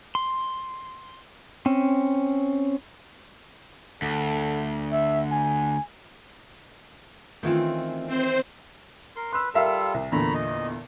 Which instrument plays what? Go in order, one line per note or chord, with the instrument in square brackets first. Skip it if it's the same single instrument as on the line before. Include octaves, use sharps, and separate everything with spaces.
[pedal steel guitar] C6
C4 C#4
[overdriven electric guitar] D2 [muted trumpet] A4
[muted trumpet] E5
G#5
[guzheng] D#3 E3 C4 [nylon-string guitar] A3 C#4 F4
[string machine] C4 C5
[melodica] A#4 C6
[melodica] B4 [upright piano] C6 E6
[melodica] G3 F4 A4 [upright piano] A#4 E5 F5
[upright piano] C2
[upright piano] E2 A#2 D3 [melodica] A#5 B5
[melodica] D#5